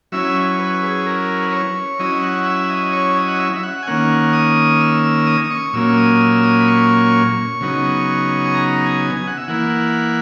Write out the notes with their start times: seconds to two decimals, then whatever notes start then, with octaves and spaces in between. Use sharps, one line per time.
0.12 F#3 C#4 E4 E5
0.59 B4
0.82 G#4
1.06 A#4
1.43 B4
1.52 C#5
1.99 F#3 C#4 E4 D#5
2.23 F#5
2.46 E5
2.70 D#5
2.93 C#5
3.16 D#5
3.28 F#5
3.40 E5
3.56 E5
3.63 F#5
3.83 G#5
3.87 D#3 A#3 C#4 F#5
4.33 D#6
4.80 E6
5.04 E6
5.27 D#6
5.44 D#6
5.51 C#6
5.73 A#2 F#3 A#3 C#4 E6
5.97 D#6
6.20 E6
6.44 D#6
6.60 B5
6.68 C#6
7.61 C#3 F#3 B3 D#4
8.45 G#5
8.55 A#5
8.86 G#5
9.17 G#5
9.27 F#5
9.38 E5
9.48 E3 A#3 E4 F#5